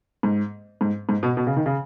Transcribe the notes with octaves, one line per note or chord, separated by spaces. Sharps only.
G#2
G#2
G#2
B2
B2
C#3
D#3
C#3